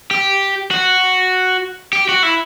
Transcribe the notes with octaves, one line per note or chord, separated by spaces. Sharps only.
G4
F#4
G4
F#4
E4